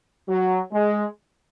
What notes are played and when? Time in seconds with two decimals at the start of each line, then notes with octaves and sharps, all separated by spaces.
0.29 F#3
0.73 G#3